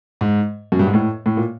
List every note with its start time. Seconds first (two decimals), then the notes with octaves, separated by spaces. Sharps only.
0.21 G#2
0.72 F#2
0.79 G2
0.87 G#2
0.94 A2
1.26 A2
1.37 A#2